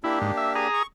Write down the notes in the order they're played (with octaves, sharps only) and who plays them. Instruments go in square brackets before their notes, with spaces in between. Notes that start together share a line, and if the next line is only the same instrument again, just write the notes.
[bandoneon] A#3 D4 G4 [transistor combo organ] E4
[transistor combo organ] G#2
E5
G#4 A#5 D#6
[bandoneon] C#6